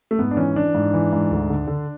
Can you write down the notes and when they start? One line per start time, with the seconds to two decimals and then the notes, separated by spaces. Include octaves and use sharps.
0.11 A3
0.19 G#2 B3
0.31 D4
0.37 E3 C#4
0.56 E3 D4
0.75 G#2
0.94 E3
1.13 G#2
1.31 D2
1.50 D3
1.67 D3